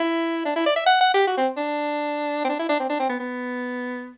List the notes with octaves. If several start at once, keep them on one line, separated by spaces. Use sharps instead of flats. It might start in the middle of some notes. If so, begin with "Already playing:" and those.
Already playing: E4
D4
E4
D5
E5
F#5
F#5
G4
F#4
C4
D4
C4
D4
E4
D4
C4
D4
C4
B3
B3